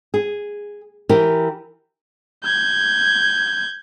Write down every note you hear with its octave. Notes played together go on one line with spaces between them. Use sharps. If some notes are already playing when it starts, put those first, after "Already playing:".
G#4
E3 G4 A#4
G6 G#6